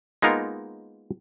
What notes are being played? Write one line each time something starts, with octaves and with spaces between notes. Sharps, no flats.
G#3 A#3 B3 D#4 F4 A#4